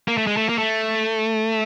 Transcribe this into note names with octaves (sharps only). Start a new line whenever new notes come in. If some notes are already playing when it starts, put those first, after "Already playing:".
A#3
A3
G#3
A3
A#3
A3